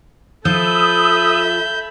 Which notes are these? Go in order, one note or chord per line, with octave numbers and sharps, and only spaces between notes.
F3 A4 E5 B5 D#6 E6 G6